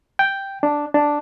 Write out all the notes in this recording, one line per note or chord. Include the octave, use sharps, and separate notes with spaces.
G5
D4
D4